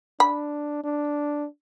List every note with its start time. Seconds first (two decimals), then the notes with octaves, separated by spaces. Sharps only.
0.20 D4 B5
0.84 D4